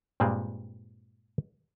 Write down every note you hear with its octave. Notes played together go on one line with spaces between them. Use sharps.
G2 A#2 G3 G#3 C4